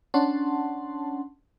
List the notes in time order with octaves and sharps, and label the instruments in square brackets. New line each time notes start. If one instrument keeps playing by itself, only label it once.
[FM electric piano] C#4 D4 F#5 A5 C6